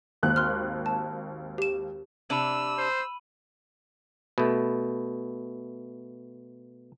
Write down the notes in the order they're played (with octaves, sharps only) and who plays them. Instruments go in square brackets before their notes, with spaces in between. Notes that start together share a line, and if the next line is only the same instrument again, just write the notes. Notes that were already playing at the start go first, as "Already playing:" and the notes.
[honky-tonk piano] G#1 D#2 F#6
[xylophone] C6 F6
A5
G4 E7
[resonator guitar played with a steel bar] C3 D4 [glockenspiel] B5 D#7 F#7 [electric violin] E6
[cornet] C5
[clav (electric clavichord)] B2 A3